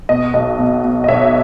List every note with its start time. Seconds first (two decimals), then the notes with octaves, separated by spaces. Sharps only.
0.09 B2 D#5
0.34 B1 D#5
0.59 B2
0.84 B2
1.04 D#5
1.08 B1 C#5 E5